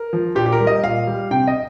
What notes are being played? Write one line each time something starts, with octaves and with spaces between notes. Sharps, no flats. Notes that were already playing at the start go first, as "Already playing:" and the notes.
Already playing: A#4
F3
A#2 G4
G4
A#4
G3
D#5
A#2 F5
G3
C3 G5
D#5